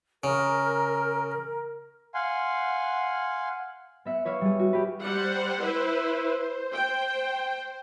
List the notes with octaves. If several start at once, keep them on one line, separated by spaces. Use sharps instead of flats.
C#3 A#4
F5 F#5 G#5 C6
B3 E5 F#5
B4 C#5 E5 F5
G3 G#4
F#4
G4 B4
G3 C5 F#5
E4 B4
G5